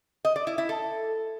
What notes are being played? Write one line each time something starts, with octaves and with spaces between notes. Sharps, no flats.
D#5
D5
E4
E4
A4